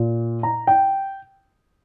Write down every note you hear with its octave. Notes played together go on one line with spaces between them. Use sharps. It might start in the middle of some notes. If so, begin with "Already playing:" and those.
Already playing: A#2
A#5
G5